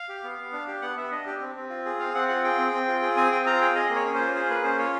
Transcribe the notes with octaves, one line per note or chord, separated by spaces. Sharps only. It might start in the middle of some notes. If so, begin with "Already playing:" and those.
Already playing: F5
G4
B3
B3
D4
G4
B3 F#5
B3 E5
D4 D#5
G4
C4
C4
F4
G#4
C4 F5
C4 F#5
F4 F#5
G#4 G5
C4
C4
F4
G#4
C4 G#5
C4 G5
F4 A#5
G#4 G5
G#4 D#5
A#3
C#5
C#4
C5
F4
G#4 C5
A#3 B4
C#4 C5
F4 C#5